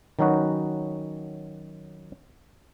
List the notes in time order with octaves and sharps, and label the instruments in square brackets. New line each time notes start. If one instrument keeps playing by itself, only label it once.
[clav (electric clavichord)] D#3 F#3 C#4 D#4 F#4 B4